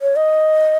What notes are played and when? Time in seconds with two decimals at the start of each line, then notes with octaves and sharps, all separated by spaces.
0.02 C#5
0.16 D#5